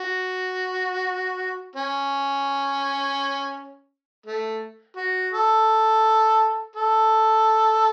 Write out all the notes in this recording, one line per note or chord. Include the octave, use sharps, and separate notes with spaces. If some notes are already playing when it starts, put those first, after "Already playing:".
Already playing: F#4
C#4
A3
F#4
A4
A4